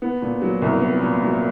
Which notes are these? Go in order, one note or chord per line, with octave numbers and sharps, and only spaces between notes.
B3
A#2
F#3
C2
B3
A#2
F#3